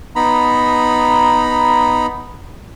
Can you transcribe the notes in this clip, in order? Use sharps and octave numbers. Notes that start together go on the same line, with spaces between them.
B3 D#4 A#5 B5